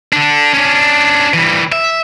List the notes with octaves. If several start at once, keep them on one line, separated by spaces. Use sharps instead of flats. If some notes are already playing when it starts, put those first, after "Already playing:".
D3 D4
C#4 D4
E3 G3
E5